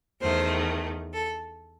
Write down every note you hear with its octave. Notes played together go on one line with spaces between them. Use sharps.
E2 D#3 A3 C5
A4